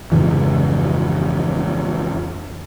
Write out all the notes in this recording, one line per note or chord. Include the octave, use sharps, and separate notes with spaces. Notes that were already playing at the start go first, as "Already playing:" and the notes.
F2 G#2 C#3 E3